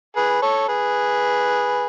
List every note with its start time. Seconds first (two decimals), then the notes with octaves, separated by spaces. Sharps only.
0.16 G#4 B4
0.42 A4 C#5
0.68 G#4 B4